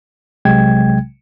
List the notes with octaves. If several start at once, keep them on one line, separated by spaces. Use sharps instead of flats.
B1 C3 F#3 G#3 G5 G#6